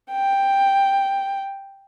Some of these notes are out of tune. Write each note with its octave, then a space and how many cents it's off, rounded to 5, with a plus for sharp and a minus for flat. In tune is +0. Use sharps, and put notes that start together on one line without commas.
G5 +5